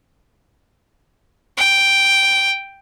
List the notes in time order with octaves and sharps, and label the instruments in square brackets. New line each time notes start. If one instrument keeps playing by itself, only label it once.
[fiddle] G5